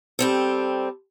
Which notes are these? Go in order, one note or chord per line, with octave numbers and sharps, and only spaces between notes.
G3 C4 A4